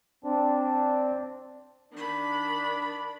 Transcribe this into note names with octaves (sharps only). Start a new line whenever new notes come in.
C4 D4
D#3 D4 B5